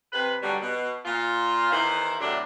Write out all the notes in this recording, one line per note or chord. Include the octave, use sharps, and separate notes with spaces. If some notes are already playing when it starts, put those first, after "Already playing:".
C3 B4
B2 D3 F#3 G3
B2
A#2 F4
E2 D#3 B3 E4 C5
E2 A2 C3 F#3 A3 D4